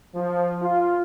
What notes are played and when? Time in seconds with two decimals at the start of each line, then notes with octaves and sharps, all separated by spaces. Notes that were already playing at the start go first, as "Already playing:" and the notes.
0.15 F3
0.62 F4